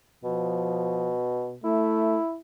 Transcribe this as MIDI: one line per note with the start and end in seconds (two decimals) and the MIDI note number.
0.24 1.56 47
0.24 1.17 53
1.64 2.19 57
1.64 2.37 64